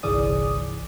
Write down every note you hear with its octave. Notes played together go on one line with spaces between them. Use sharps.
G1 C2 E3 G#4 D5 D#6